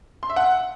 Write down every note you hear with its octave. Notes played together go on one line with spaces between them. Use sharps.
C6
E5
F#5